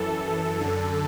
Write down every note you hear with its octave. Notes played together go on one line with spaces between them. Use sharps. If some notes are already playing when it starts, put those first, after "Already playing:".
Already playing: F#2 E3 A4
F#2 D3